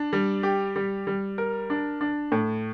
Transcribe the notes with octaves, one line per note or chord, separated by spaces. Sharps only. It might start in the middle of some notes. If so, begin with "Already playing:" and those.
Already playing: D4
G3
G4
G3
G3
A#4
D4
D4
A2